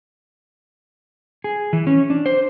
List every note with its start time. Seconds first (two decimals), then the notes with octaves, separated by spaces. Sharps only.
1.44 G#4
1.73 E3
1.87 C#4
2.10 D4
2.26 C5